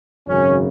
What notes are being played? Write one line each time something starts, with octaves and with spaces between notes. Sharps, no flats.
G#1 F#2 C#3 C#4